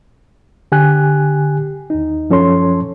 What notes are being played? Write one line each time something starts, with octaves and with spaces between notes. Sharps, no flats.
D3 G4 G#5 F#6
D#2 D#4
F#2 F3 C#4 A4 C#5 C6